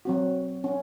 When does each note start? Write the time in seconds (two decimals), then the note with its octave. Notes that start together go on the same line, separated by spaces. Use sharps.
0.05 F#3 C4 F#4
0.64 C#4